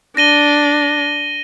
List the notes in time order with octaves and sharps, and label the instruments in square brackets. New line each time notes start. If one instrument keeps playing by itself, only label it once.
[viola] D4 [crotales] A#6 D#7 G7